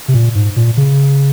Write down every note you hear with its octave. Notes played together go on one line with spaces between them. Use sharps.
C3
A#2
G#2
A#2
C#3